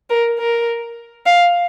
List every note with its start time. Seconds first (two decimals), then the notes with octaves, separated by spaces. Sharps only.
0.10 A#4
0.39 A#4
1.26 F5